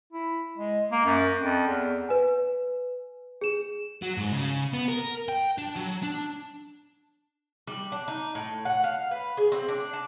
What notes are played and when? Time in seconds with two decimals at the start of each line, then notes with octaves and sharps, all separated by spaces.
0.13 E4
0.58 G#3
0.92 A#3
1.06 F#2
1.39 F2
1.67 E2
2.09 B4 G#5
3.41 G#4 E7
4.02 F#3
4.18 G#2
4.33 C#3
4.74 B3
4.88 A#4
5.29 G5
5.58 D4
5.76 F#3
6.03 D4
7.67 G3
7.92 D4
8.08 D#4
8.35 A2
8.65 F#5
8.84 F5
9.11 B4
9.37 G#4
9.52 C4
9.68 D4
9.93 A5